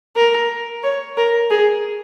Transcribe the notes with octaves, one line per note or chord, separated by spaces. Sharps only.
A#4
C#5
A#4
G#4